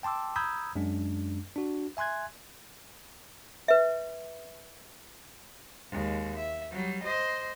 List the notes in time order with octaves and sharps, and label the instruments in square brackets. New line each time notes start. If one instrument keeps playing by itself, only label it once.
[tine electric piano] G5 A5 C6 D6 E6
A#5 B5 D#6 E6 G6 G#6
F#2 G#3 D4
D4 F#4
E5 G#5 C6 F#6 G#6
[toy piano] B4 E5
[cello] D#2 G#3
E5
F#3 G3
C5 D#5